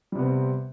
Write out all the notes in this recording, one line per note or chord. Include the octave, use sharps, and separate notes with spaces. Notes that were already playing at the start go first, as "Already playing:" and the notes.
C3 G3 B3 C4